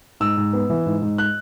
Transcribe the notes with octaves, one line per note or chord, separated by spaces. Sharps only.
G#2 E6
G#2
B3
E3
G#2
G#2
F#6